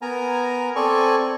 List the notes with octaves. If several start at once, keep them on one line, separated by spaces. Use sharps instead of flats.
B3 A#4 G#5 A#5
C4 A4 D5 G#5 C#6